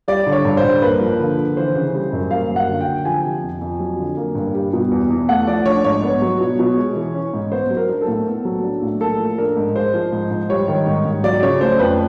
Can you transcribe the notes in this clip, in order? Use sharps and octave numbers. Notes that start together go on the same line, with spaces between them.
G3 D5
D3
C#5
G2
C5
G2
A#3 B4
F3
D3
D3
E3 C5
C#3
G3
F#2
A#3 F5
F#3
F#5
D3
G5
D3
F3 G#5
C3
F2
F2
F#3
D3
A#3
G2
G3
B2
E2
E2
A3 F#5
F3 D5
D4 C#5
G#2 C#5
B3
F#3
B2
B2
G#3
E3
C#4
G#2
B3 C5
F#3
A#4
D4
A4
A2
B3
F#3
D4
A2
A#3 A4
F3
D4 A#4
G#2
G#3 C5
F3
G#2
G#2
G3 C#5
D#3
G#2
G#2
F#3 D5
C#3 C#5
A3 C5
F2 B4